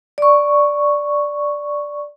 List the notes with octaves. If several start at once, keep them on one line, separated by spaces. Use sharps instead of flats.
D5 C#6